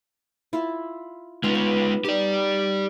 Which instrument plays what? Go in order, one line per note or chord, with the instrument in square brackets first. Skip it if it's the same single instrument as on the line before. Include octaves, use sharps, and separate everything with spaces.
[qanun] E4 F4 E5
[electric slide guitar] G#3 F4 [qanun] B3 D#4 D5
[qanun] B3
[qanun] D#4 D#5 [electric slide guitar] G4 D5